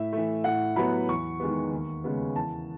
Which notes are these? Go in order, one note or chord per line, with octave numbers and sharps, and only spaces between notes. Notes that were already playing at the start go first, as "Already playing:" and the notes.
Already playing: A2 E5
E3 A3
A2 F#5
F#3 B3 B5
E2 C#6
D#3 G#3 B3
D#2
C#3 G#3 B3
E2 A5